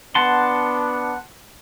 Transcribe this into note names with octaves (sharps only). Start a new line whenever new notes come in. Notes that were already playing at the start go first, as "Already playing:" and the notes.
B3 D4 F#5 A5 C6